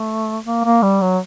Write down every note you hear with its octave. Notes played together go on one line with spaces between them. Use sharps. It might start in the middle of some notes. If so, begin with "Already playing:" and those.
Already playing: A3
A#3
A#3
G3
F#3